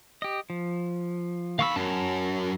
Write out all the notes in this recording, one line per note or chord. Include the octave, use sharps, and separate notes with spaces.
G4 D#5
F3
D#2 F5 B5 C#6 E6
F#2 C#5 A5